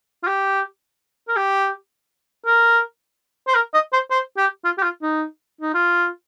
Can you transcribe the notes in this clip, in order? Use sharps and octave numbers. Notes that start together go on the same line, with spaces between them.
F4
G4
A#4
G4
A#4
C5
A#4
D#5
C5
C5
G4
F4
G4
F4
D#4
D#4
F4